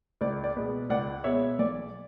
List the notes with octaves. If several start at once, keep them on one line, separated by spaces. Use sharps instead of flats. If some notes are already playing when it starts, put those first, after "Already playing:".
C#2 D5
D5
B2 G#3 B3
C#2 D5 F#5
B2 G#3 B3 C#5 E5
B1 D5